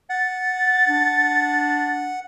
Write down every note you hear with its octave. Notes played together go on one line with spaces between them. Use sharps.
F#5 A6
D4